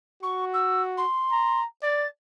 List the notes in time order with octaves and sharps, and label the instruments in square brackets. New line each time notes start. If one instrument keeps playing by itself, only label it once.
[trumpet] F#4 [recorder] C#6
[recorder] E6
C6
[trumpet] A#5
[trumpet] D5 [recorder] A6